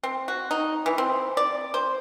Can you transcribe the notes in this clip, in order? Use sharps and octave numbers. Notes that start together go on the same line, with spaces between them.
C4
F#4
D#4
E3
C4
D5
C5